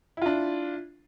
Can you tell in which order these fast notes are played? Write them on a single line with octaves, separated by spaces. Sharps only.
E4 F4 D4